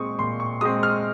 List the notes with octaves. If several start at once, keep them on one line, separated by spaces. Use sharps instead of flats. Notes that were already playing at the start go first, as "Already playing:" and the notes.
Already playing: A#2 G#3 C4 C#6 D#6
A#2 C6
C#6
G#3 C4 D#6
F6